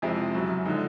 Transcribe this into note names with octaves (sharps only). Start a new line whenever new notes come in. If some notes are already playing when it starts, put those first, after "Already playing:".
F2 C3 F3 G#3 E4
F#2 C#3 F#3
D3 F3 G#3 D#4